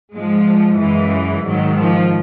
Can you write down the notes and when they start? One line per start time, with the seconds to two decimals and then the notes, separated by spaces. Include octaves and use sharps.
0.13 G#2 F3 G#3
0.79 F#2 C#3 E3 G#3
1.46 G#2 D#3 F#3
1.79 F3